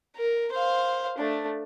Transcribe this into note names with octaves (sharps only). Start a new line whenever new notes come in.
A#4
C5 F5
A3 D4